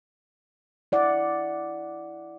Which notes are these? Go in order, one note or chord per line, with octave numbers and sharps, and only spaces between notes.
E4 D5 F#5